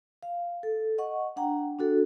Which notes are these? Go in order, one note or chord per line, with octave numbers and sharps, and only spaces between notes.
F5
A4
D#5 F#5 C#6
D4 F#5 G5 A#5
D4 F#4 A4